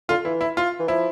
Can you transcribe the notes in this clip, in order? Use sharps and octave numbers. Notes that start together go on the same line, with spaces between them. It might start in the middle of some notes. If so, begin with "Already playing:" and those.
D3 F4
E3 E4
E4
F4
E3
F3 E4